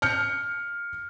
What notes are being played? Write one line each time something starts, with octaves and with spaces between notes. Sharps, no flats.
F6 G6 C#7